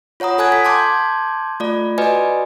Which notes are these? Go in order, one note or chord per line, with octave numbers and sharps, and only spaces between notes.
F4 C#5 F#5 A#5 D#6
A4 F#5 G#5 D#6 F#6 G#6
B6
A5 C6 D6 G6 G#6
A3 F4 D5
F#4 B4 D5 D#5 G#5